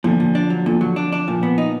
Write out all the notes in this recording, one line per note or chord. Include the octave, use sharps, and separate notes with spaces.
A#2 D3 F3
A#2
D4
F#3
A#2 D3 F3
F#3
D4
D4
A#2 F3
B3
D#4